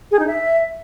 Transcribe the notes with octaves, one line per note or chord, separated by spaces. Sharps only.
G#4
D#4
E5